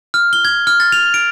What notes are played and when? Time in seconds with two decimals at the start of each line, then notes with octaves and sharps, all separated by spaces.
0.14 F6
0.33 G7
0.45 G#6
0.67 F6
0.80 A6
0.92 F7
1.14 D7